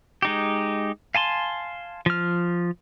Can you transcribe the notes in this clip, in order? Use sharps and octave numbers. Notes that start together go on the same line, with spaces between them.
G#3 D#4 G4
F5 G#5 A5 C6
F3 F6